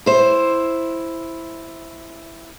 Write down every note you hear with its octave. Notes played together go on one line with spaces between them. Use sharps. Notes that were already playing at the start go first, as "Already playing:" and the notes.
E4 C5